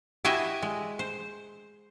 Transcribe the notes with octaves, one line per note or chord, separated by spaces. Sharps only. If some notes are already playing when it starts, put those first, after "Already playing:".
E4 F#4 G4 D#5 E5 G#5
G#3
C5